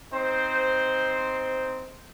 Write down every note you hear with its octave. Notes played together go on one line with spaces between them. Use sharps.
C4 D#4 C5